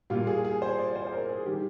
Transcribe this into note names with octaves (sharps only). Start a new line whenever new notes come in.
A#2 G3 F4
G#4
G#4
C5
D5
C5
C5
A#4
G#4
D#3 G3 G4